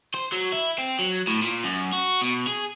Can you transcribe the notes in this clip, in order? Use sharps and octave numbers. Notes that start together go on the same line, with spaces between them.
C5
F#3
E4
C4
F#3
A2
A#2
F#2
F#4
B2
G#4